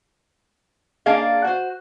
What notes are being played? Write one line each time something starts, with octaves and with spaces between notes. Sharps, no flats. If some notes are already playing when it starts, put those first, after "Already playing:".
A#3 C#4 D4 G#4 D#5 F5
F#4 C5